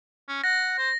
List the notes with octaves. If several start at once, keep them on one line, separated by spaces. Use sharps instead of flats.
C#4
F#5 A#6
C5